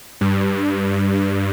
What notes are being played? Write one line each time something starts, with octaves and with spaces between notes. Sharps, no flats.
G2